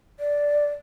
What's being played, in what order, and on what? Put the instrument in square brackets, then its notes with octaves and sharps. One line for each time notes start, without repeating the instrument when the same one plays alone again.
[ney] D5